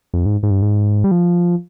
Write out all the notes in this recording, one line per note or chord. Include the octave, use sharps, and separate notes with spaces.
F2
G#2
G#2
G2
G#2
G3
F3